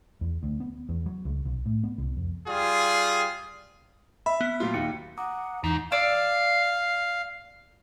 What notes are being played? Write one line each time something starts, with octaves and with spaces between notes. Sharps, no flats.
E2
D2
B3
E2
F#3
C#2
B1
A2
B3
C2
F2
G3 F4 G#4
E5 B5
B3
A#2 F#3 F4
D#2 C#7
F#5 A#5 D6 D#6
E2 G#2 D#4
D5 F5 E6